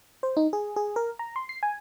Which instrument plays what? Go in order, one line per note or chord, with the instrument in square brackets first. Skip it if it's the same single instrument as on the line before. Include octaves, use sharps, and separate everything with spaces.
[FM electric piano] C5
D#4
G#4
G#4
A#4
A#5
C6
C7
G#5